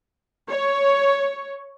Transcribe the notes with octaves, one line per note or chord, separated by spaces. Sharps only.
C#5